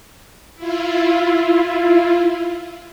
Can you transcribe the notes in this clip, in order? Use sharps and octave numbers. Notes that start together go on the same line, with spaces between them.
E4 F4